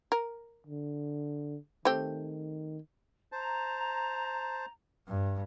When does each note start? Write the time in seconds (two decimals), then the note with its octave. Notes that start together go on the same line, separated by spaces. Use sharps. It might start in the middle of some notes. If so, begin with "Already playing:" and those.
0.12 A#4
0.67 D3
1.85 D#3 A3 C4 G4
3.32 C5 A5 A#5
5.08 G2